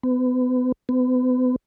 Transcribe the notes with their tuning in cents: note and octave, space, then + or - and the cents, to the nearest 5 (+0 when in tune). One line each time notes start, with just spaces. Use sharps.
B3 +35
B3 +40